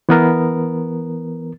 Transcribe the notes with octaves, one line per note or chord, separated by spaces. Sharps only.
E3 B3 A#4